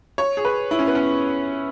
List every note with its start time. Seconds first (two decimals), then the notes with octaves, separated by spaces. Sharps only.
0.18 C#5
0.37 G#4
0.45 B4
0.71 E4
0.79 C#4
0.87 B3
0.95 C#4